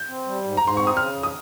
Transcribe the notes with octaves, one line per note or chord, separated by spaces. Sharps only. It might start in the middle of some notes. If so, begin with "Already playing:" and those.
Already playing: G6
C4
G3
G#2
G#2 A#5
C6
C4 C#6
D#6
C#3 F6
F2
D#6